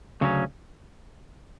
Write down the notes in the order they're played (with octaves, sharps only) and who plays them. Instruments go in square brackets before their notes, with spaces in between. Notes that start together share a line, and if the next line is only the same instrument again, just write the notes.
[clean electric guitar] D2 C#3 F#3 C#4